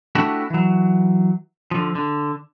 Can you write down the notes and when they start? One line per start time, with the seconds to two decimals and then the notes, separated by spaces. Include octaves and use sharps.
0.15 A3 D4 E4 F#4 G4
0.50 E3 F#3
1.71 D3 F3
1.95 D3